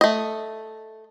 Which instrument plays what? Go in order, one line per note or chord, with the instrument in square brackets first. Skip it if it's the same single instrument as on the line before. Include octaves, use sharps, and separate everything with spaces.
[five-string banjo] A3 D#5